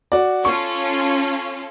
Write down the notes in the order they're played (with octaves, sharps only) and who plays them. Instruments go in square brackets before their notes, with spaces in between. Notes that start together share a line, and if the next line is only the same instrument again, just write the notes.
[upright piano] F#4 D5
[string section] C#4 F4 A4 [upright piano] C#6